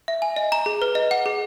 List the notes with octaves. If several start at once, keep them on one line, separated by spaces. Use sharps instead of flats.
E5
G#5
D#5
A#5
G#4
B4
D#5
F#5
G#4